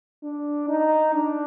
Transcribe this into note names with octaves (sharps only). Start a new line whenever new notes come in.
D4
D#4
D4